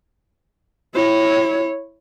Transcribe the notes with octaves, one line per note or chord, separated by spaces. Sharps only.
E4 C#5